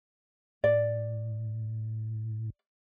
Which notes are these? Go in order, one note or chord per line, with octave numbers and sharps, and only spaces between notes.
A2 D5